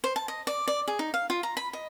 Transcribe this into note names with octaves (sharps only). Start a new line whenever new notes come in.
C5
A5
D#5
D5
D5
G#4
D#4
F5
F4
A#5
B5
D#5